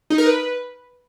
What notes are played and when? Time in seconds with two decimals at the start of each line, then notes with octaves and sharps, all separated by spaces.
0.10 D#4
0.18 A#4
0.26 B4